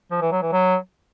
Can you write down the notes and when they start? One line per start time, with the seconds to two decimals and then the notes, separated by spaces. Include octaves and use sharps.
0.11 F3
0.22 E3
0.32 F#3
0.42 E3
0.52 F#3